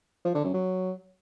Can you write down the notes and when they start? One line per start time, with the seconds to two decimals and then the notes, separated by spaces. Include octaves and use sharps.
0.25 F3
0.34 D3
0.44 F#2
0.54 F#3